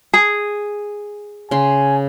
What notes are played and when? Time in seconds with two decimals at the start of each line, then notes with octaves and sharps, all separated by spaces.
0.14 G#4
1.51 C#3 G#5 C6